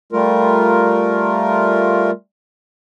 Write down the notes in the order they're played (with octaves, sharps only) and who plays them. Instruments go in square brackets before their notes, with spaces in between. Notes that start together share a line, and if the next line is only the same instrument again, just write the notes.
[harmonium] G3 A3 F4 A#4